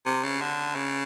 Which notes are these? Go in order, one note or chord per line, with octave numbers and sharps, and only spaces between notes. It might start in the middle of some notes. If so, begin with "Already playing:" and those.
C3
C#3
D3
C#3